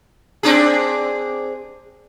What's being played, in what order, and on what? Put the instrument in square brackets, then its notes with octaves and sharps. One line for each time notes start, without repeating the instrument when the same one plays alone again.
[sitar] C4 D4 G#4